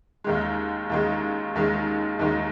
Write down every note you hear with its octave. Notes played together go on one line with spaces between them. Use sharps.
D#2 D#3 G#3
D#2 D#3 G#3
D#2 D#3 G#3
D#2 D#3 G#3